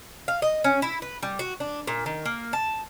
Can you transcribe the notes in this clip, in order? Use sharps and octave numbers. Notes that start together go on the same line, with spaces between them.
F5
D#5
C#4
E4
B4
G3
F#4
D4
A#2
D#3
A#3
A5